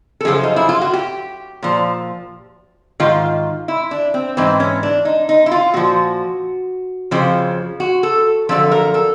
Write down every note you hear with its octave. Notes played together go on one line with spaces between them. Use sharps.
A4
F#2 C#3 F3 G#4
D#4
E4
F4
F#4
G4
A#2 F3
G#2 D#3 F4
E4
D4
C4
G#2 E3 C4
C#4
D4
D#4
D#4
E4
F4
A#2 F3 F#4
F2 C#3 F3
F#4
A4
F#2 D3 F3 A4
A#4
A4